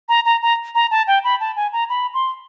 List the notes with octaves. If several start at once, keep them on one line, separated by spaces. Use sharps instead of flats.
A#5
A#5
A#5
A#5
A5
G5
B5
A5
G#5
A#5
B5
C6